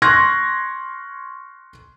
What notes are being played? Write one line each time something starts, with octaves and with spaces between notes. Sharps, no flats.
C6 C#6 F6 F#6 G#6 A#6